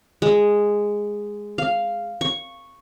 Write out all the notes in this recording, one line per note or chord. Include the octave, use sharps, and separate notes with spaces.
G#3
F5
C#6